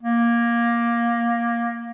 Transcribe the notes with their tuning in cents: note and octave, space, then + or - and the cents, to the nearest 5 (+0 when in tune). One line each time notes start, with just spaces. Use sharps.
A#3 +10